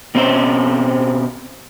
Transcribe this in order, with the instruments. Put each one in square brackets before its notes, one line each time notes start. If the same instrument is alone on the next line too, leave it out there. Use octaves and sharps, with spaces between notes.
[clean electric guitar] B2 C4 C#4 C5